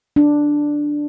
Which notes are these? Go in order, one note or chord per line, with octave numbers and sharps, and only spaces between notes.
D4